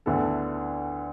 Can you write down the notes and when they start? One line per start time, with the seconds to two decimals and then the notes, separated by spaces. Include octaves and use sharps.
0.06 D2 D3 B3 E4 A4